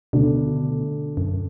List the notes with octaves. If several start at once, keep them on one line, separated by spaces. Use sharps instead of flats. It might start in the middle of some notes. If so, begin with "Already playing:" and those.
D2 B2 D3 A3 D4
F#2